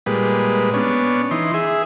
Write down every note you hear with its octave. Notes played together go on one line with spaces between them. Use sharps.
A#2 G3 G#3 B4
B3 C#4 D4
E3 D#4 C6
G#4 E5